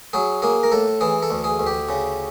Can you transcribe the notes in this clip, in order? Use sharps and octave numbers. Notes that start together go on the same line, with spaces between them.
F#3 G#4
A#3 G#4
A#4
A2 A4
E3 G#4
A4
D2
G#4
D2
G4
C#3